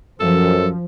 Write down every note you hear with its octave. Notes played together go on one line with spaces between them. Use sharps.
F#2 F3 A4